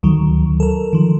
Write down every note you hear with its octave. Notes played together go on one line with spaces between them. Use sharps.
D2 D#3 F#3
A4 A#4
D#3 F3